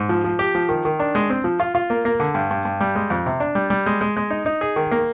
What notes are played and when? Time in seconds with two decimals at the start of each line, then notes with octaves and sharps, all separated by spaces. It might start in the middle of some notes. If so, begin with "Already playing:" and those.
Already playing: G#2
0.09 F3
0.24 F3
0.39 G4
0.55 F3
0.69 D#3
0.85 D#3
0.99 D4
1.15 G#3
1.30 C4
1.44 F3
1.60 F4
1.75 F4
1.90 A#3
2.05 A#3
2.20 D3
2.34 G2
2.51 G2
2.65 G2
2.80 G3
2.95 G#3
3.10 F2
3.26 C3
3.40 D4
3.55 G3
3.70 G3
3.86 G#3
4.01 G#3
4.17 G#3
4.30 D#4
4.46 D#4
4.61 G#4
4.76 D#3
4.91 A#3